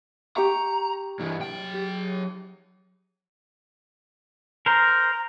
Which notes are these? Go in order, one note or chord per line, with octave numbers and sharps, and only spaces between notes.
G4 A#5 C#6
G2 E3
F#3 G5
G4
A#4 C5 A#5